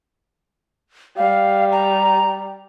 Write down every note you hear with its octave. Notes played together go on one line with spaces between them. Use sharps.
G3 F5
A#5